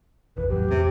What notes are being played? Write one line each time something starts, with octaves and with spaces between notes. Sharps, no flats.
F1 A#1 E3 B4
E2 A2 F#3 G4
E2 C3